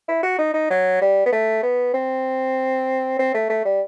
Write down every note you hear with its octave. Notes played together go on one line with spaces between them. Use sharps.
E4
F#4
D#4
D#4
F#3
G3
B3
A3
B3
C4
C4
A3
A3
G3